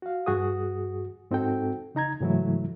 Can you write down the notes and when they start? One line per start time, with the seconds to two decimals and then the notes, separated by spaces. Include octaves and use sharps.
0.02 F#4 F5
0.26 G2 F#4 G#4 D#6
1.31 G#2 C4 D#4 F#4 A4 G5
1.95 C#3 D#4 A#5 G#6
2.20 G#2 C#3 E3 F#3 A3 E4